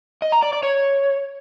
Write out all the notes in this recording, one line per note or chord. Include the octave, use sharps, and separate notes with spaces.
D#5
A#5
D5
D5
C#5